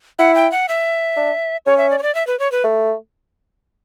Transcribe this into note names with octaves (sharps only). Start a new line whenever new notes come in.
E4 F#5
G5
F#5
E5
D4
C#4 C#5
E5
D5
C#5
D5
E5
B4
C#5
B4
A3